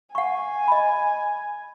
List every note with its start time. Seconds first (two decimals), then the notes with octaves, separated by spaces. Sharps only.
0.15 F#5 G#5 C#6
0.68 D#5 B5